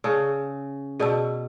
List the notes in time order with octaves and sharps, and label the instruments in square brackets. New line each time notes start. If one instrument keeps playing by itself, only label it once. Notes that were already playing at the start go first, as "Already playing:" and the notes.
[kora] C#3 [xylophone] G#4 D5 A5 E6
[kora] B2 [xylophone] G#4 D5 A5 E6